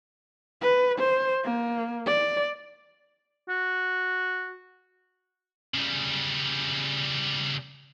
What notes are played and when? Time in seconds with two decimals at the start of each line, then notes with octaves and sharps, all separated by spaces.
0.61 B4
0.99 C5
1.44 A#3
2.06 D5
3.49 F#4
5.74 C#3 G3